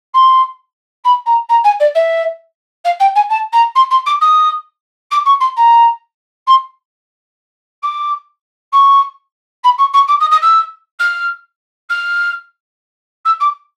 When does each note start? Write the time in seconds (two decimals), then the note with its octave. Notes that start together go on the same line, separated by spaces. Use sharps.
0.14 C6
1.04 B5
1.26 A#5
1.49 A#5
1.64 G#5
1.80 D5
1.95 E5
2.84 F5
2.99 G5
3.15 G#5
3.29 A5
3.52 A#5
3.75 C6
3.90 C6
4.06 D6
4.21 D#6
5.11 D6
5.25 C#6
5.40 C6
5.56 A#5
6.47 C6
7.82 D6
8.72 C#6
9.64 B5
9.78 C#6
9.93 C#6
10.08 D6
10.20 D#6
10.31 D#6
10.42 E6
10.99 F6
11.89 F6
13.25 E6
13.40 D6